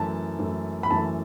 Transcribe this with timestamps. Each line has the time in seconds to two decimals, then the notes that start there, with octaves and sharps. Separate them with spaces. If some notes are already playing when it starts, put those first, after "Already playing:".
Already playing: F#2 E3 A3 A5
0.39 F#2 E3 A3
0.83 B5
0.91 F#2 E3 A3 A5